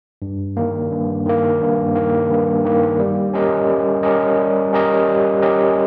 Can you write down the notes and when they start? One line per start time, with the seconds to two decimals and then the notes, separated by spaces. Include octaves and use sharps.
0.22 G2
0.57 D#3 A#3
0.91 G2
1.26 D#3 A#3
1.61 G2
1.95 D#3 A#3
2.31 G2
2.65 D#3 A#3
2.99 G3
3.33 C#4 G4 A#4 D#5
3.69 G3
4.03 C#4 G4 A#4 D#5
4.38 G3
4.73 C#4 G4 A#4 D#5
5.07 G3
5.42 C#4 G4 A#4 D#5